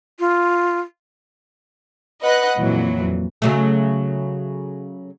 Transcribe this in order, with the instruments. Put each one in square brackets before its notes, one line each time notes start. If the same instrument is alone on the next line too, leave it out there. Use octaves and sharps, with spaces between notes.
[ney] F4
[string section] B4 D#5 F#5 F#6
F2 A#2 E3 F#3
[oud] C#3 F#3 A3